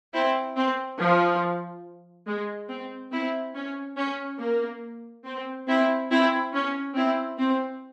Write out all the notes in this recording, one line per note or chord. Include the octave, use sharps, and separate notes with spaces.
C4 E4
C4
F3
G#3
C4
C4 E4
C#4
C#4
A#3
C4
C4 E4
C4 E4
C#4
C4 E4
C4